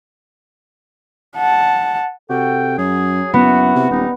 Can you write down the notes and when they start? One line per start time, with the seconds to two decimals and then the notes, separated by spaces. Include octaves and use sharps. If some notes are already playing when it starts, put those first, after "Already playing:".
1.36 F#5 A5
2.30 C3 F#4 A4 G5
2.78 F#2 F#3 G#4
3.34 F#2 B3 E4 F#4
3.76 C3
3.90 D#1 G3 D#4